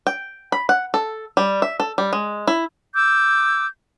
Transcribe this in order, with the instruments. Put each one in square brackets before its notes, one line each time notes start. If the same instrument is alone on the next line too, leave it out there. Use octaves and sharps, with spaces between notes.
[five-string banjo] G5
B5
F#5
A4
G3
E5
A4
G3
G#3
E4
[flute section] D6 E6 G6